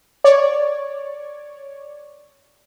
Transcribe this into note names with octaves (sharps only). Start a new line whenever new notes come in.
C#5 D5